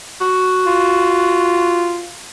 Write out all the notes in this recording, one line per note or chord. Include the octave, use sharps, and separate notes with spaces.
F#4
F4